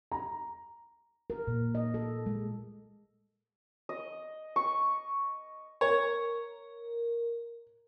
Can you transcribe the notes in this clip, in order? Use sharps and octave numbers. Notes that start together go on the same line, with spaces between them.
A#5
A#4
A#2
D#5
A4
G#3
D#5
C#6
A#4 C#5